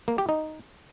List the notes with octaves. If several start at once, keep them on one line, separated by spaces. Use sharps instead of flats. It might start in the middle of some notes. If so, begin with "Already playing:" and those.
A#3
G4
D#4